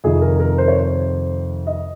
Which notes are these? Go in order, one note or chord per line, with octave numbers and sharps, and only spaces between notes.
F2 C3 D#3 G#4
A#4
A#4
C5
C#5
C5
D#5